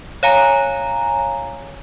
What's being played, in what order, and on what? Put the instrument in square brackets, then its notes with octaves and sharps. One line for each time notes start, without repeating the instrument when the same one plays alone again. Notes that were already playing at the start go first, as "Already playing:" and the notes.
[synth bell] C#5 F5 G#5 A#5